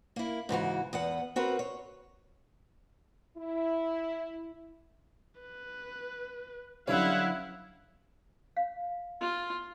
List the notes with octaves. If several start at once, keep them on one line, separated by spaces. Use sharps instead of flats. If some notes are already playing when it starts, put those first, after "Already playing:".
A#3 E4
G#2 C#3 E3 F#4
E2 B3 F#5
C4 F#4 A#4 B4
C#5
E4
B4
B1 D3 G3 C#4 E4 C#5 F5 F#5
F5
F4